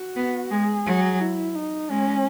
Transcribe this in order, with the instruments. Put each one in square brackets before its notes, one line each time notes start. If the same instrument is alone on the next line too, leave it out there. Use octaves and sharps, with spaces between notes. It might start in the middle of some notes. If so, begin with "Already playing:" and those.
Already playing: [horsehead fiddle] F#4
[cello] B3
[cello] G#3 [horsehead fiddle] G#4
[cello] F#3
[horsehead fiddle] E4
D#4
[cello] G#3 [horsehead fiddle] C#4